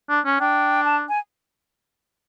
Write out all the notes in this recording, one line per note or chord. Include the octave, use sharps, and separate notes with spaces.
D4
C#4
D4 G5
A5
G#5